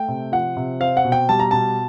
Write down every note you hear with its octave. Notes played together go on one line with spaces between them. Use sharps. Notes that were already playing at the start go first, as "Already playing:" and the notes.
Already playing: A3 G5
C3
F3 F#5
C3
C4 F5
F#5
B2
G5
G3 A5
A#5
B2 A5